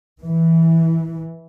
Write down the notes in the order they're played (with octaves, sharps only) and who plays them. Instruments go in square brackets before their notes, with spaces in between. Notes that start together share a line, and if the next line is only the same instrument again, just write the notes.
[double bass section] E3